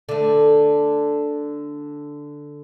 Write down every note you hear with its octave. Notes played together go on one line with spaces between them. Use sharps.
D3 A3